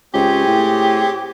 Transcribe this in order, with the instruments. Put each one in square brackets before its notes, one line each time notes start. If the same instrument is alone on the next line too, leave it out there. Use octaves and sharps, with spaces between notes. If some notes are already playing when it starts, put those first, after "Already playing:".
[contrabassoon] C#2 [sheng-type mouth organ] C4 G#4 C#5 [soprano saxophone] G4
[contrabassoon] A2